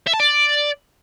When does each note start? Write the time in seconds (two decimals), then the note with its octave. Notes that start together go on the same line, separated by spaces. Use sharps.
0.07 E5
0.13 A5
0.20 D5